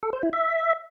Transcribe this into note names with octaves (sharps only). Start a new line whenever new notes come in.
A4
C5
E4
E5